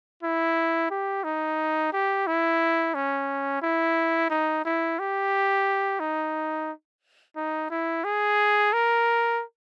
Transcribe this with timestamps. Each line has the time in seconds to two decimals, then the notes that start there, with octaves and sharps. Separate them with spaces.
0.23 E4
0.90 G4
1.24 D#4
1.93 G4
2.27 E4
2.95 C#4
3.62 E4
4.30 D#4
4.65 E4
4.99 G4
6.00 D#4
7.36 D#4
7.71 E4
8.04 G#4
8.73 A#4